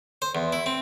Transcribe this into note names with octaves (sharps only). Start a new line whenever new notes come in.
C5
E2
E4
C4